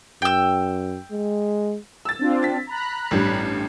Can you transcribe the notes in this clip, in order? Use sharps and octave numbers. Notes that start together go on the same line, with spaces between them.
F#2 G5 E6
G#3
E6 A6
C4 D4 F4
A6 B6
A#5 B5 F#6
A1 G2 G3